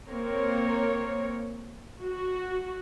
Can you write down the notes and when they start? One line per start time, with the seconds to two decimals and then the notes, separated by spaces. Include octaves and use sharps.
0.10 A#3 C4 A#4 C#5
2.00 F#4